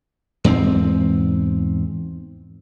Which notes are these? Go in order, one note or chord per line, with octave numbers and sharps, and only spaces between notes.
E2 G#2 A3 C4